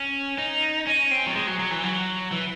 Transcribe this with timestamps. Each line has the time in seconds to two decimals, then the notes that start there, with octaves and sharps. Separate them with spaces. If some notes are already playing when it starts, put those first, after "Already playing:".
Already playing: C#4
0.38 D#4
0.87 C#4
1.11 C4
1.27 F#3
1.36 G#3
1.47 F#3
1.60 F#3
1.71 E3
1.83 F#3
2.32 E3